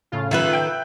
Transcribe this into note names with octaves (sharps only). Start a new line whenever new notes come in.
A2 C#3 F4
A1 D#3 F4 A4 B4 E5 F#6
G5 G6